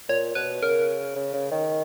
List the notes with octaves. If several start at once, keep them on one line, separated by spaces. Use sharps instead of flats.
A#2 C#5
B2 B4
C#3 A#4
C#3
C#3
D#3